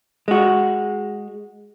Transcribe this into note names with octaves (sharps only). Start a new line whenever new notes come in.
G#3 F#4